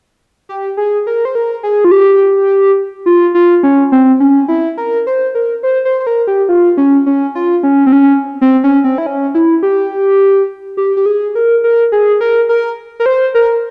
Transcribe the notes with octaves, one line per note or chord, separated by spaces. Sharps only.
G4
G#4
A#4
C5
A#4
G#4
F4
G4
F4
F4
C#4
C4
C#4
E4
A#4
C5
A#4
C5
C5
C5
A#4
G4
F4
C#4
C#4
F4
C#4
C4
C#4
C4
C#4
C4
E4
C#4
E4
G4
G4
G4
G#4
A#4
A#4
G#4
A#4
A#4
A#4
C5
A#4